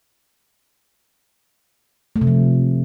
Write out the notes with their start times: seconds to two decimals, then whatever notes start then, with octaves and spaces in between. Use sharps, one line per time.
2.16 A3
2.21 C3
2.27 F3